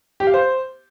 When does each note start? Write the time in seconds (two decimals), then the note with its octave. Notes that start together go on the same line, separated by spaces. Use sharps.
0.20 G4
0.27 F5
0.34 C5